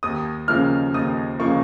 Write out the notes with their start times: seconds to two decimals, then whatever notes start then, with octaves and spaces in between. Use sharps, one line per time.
0.03 D#2 D#6
0.48 C#3 F3 A#3 F6
0.94 D#2 D#6
1.40 C#3 F3 A#3 C#6